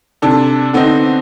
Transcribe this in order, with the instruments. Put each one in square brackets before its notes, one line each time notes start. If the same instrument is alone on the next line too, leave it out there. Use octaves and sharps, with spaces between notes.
[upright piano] C3 D4 A4
D3 B3 C4 D4 D#4